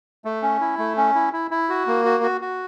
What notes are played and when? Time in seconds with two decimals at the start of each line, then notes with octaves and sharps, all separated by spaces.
0.25 A3
0.42 C#4
0.61 E4
0.78 A3
0.97 C#4
1.15 E4
1.33 E4
1.51 E4
1.69 F#4
1.87 A#3
2.05 F#4
2.23 F#4
2.41 F#4